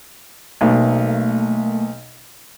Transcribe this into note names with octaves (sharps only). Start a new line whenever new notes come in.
B1 A3 A#3